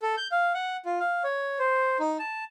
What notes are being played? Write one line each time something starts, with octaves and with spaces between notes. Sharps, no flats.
A4
G6
F5
F#5
F4
F5
C#5
C5
D#4
A5